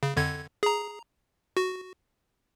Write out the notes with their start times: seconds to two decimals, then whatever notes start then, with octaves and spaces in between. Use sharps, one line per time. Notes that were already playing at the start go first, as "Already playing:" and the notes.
0.03 C#3
0.17 F2 D3 G#6
0.63 G#4 A#5
1.57 F#4